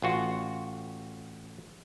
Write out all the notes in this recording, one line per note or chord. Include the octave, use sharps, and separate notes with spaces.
A1 F4 F#4